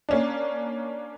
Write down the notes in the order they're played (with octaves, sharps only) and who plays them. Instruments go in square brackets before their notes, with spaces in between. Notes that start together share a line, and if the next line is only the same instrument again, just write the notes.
[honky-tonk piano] A#3 C#4 D4